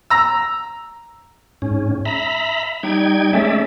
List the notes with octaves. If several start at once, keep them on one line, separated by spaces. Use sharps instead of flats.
A#5 E6
G#2 C#4
E5 A#5 B5
G3 D#4 G5 G#6
G#3 A3 C#4 D5 E5